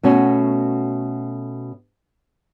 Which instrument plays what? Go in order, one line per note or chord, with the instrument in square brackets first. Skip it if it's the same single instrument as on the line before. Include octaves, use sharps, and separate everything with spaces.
[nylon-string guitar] B2 A3 C#4 F#4